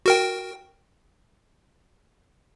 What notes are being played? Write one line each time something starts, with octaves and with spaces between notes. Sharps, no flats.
F#4 A#4 G5